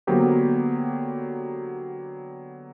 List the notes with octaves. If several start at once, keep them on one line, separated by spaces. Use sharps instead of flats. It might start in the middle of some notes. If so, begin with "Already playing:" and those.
D3 F#3 A#3 B3 G4 C5